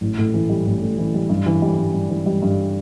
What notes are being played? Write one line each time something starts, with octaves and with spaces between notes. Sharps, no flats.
A1
A2
E3
G3
A1
A2
E3
G3
G2
E3
G3
G2
G2
E3
G3
G2